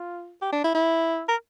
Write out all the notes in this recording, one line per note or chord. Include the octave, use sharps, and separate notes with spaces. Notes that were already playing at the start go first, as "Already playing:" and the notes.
Already playing: F4
G4
D4
E4
E4
A#4